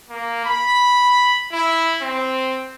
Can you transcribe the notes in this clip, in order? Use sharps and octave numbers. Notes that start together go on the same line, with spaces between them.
A#3
B5
E4
C4